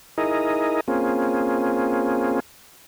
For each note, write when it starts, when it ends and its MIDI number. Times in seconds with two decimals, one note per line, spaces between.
0.18 0.80 63
0.18 0.80 64
0.18 0.80 68
0.18 0.80 70
0.18 0.80 75
0.88 2.40 58
0.88 2.40 60
0.88 2.40 61
0.88 2.40 65
0.88 2.40 68